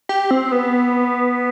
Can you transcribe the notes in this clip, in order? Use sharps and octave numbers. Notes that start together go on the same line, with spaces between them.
G4
C4
B3